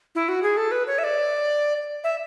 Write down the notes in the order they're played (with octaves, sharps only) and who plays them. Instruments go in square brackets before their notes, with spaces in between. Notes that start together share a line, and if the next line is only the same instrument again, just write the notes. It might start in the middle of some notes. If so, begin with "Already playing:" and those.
[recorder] E4
F#4
G#4
A4
B4
C#5
E5
D5
E5